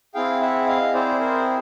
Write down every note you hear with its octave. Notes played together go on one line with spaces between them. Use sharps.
C4 E4 G#4 F5 G5
E5 F#5
D#5 F5
C4 E4 G#4 C5 D5
A#4 C5